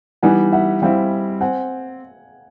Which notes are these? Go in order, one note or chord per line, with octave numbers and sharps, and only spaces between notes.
E3 G3 B3 D#4 F#5 G#5
E5 F#5
G3 C4 E4 F5 G5
C4 F#5 G#5